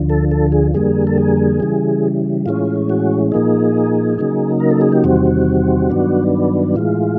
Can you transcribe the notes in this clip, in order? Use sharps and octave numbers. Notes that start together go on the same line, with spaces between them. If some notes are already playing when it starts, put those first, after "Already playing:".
Already playing: D2 D3 F3
A4
A4
G#4
F2 D3 G3 A#3 G#4
A4
G#4
C#3 E3 G3
A2 E3 G#3 C#4 F4
F#4
A#2 F3 A#3 D#4 G#4
C#3 F#3 A#3 D#4
A#4
A4
G#4
G4
E2 C3 D#3 G3 C4 F#4
G2 D#3 F#3 B3 D4
A2 E3 G#3 F4